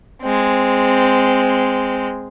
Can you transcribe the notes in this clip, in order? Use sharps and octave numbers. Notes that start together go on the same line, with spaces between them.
G#3 C4